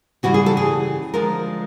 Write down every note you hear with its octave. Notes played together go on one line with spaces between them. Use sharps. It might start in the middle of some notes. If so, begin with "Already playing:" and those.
C#3 E3 G3 F#4
G#4
A4
G#4
D3 F3 G#3 A#4